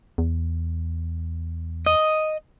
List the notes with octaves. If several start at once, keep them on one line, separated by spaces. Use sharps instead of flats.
E2
D#5